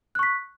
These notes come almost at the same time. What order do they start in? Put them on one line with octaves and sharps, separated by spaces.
F#6 C#6 B6